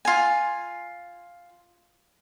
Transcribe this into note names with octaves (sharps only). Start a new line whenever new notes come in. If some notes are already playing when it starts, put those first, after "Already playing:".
F4 G#5